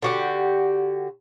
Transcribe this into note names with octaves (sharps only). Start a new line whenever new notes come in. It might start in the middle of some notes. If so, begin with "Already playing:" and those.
D3 F#4 G4